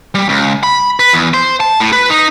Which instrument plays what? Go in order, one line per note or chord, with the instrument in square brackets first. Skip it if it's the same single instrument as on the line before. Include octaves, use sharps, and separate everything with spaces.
[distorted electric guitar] G3
C#2
B5
B4
E2
C5
A5
A2
B4
D#4